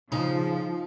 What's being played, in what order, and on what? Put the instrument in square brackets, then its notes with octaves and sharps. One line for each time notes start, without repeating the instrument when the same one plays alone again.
[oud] C#3 [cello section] F3 [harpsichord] D#4